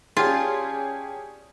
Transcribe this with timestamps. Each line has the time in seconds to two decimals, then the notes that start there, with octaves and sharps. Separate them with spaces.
0.17 C#4 F4 G4 G#4 D5 G#5 A5